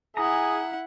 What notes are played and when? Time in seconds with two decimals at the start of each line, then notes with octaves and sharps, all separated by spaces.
0.17 E4 G#4 F#5 A#5 D#6